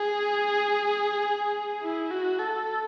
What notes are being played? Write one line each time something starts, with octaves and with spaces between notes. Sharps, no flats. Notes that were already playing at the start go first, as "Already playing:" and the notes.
Already playing: G#4
E4
F#4
A4